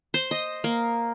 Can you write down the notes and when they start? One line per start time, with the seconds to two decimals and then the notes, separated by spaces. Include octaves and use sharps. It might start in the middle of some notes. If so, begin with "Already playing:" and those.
0.14 C5
0.31 D#5
0.64 A#3